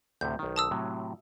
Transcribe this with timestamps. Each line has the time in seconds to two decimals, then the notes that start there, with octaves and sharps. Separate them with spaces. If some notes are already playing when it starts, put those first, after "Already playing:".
0.21 D2 A2 C3 G6
0.39 B1 D#3
0.56 A5 D#6 E6
0.71 A2 C3 F#3